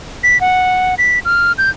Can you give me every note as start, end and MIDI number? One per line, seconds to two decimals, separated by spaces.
0.23 0.40 95
0.41 0.95 78
0.98 1.19 95
1.25 1.52 89
1.58 1.70 91